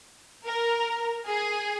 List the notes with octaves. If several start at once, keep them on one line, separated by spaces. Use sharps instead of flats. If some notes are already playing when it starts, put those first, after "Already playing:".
A#4
G#4